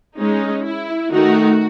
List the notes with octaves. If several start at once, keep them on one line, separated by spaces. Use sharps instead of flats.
G#3 C#4 D#4
E4
D#3 A3 D#4 F#4